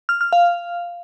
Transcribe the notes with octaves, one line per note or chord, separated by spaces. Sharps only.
F6
F6
F5